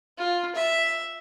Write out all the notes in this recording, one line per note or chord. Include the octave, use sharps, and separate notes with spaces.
F4
E5